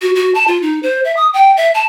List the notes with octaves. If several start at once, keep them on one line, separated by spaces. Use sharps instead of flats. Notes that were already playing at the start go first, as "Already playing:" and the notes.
F#4
F#4
A5
F4
D#4
C5
E5
D#6
G5
E5
A5